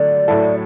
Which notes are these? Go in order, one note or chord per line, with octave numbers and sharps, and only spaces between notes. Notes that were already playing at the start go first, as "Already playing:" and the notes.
Already playing: D3 F#3 A3 D5
A2 F#3 A3 E4 A4